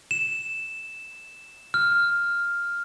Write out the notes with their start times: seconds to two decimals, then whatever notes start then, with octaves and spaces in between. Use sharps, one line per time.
0.11 E7
1.74 F6